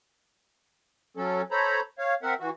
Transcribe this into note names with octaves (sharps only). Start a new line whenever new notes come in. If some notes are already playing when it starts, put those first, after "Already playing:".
F#3 C#4 A4
A4 C5 C#5 A#5 B5
C#5 F5
C4 A#4 E5 F#5
E3 F#4